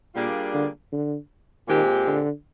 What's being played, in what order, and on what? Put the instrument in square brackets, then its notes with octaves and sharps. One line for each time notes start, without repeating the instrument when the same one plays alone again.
[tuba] A#2 [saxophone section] G3 A#3 D4 F4 G#4
[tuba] D3
D3
[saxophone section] A#2 G#3 C4 G4 [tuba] D#3
[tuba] D3